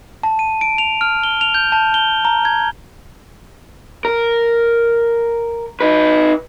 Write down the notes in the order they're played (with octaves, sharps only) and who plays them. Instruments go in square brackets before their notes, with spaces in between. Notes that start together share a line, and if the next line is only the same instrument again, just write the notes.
[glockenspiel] A5
D#7
D7
F7
F6
G7
F7
G6
A5
G7
A#5
G#6
[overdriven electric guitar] A#4
D#4 B4